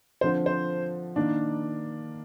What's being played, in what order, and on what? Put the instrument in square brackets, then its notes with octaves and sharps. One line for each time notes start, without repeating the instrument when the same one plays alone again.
[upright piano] D3 F3 C4 [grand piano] C5
[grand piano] C5
[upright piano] D#3 A#3 D4